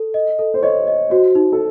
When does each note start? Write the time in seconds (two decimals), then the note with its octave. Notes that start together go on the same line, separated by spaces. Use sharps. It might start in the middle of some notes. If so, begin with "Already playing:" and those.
Already playing: A4
0.14 D#5
0.39 A4
0.54 C5
0.63 C#5 D#5
0.87 D#5
1.10 F#4 C5
1.35 D#4
1.53 A4